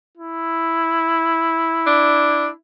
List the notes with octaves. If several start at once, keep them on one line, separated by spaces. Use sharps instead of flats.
E4
D4